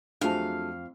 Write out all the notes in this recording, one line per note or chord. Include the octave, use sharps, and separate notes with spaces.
F2 F#3 A3 D4 F4 G#4 F5 A5